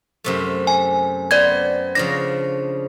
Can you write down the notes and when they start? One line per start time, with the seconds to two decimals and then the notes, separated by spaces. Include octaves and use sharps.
0.24 F#2 C3 A3
0.67 G#5
1.31 B3 C4 D5 G#6
1.95 C#3 F3 D4 A#6